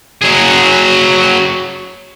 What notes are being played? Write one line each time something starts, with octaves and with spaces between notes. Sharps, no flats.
F#3 G#4